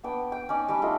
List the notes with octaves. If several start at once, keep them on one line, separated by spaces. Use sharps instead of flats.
B3 D4 G5
G5
C#4 D#4 D5
G3 D4 G5 D6
A3 D#4 F4